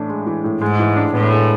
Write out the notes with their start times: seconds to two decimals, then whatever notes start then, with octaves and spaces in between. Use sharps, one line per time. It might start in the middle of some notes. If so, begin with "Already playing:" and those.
Already playing: A2 E3 D4
0.09 G#3
0.26 E3
0.44 A2
0.61 G#2 G#3
0.79 E3
0.96 D4
1.14 A2 B3
1.32 G#3